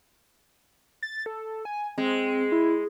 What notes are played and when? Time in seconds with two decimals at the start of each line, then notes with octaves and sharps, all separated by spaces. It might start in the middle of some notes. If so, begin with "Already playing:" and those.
1.03 A6
1.26 A4
1.65 G#5
1.98 G#3 C4
2.52 E4